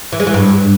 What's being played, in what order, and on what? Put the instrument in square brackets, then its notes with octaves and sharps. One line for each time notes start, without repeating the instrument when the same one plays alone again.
[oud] E3
G#3
E3
G2